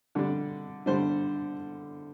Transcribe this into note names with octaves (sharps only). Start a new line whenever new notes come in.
D3 G3 D4
D3 G3 D4 C5